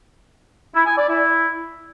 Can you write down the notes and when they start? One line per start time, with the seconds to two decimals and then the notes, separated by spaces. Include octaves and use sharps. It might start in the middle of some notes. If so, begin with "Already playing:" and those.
0.75 E4
0.86 G#5
0.97 D5
1.09 E4